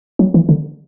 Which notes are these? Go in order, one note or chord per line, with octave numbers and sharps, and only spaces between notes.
F#3
E3
D3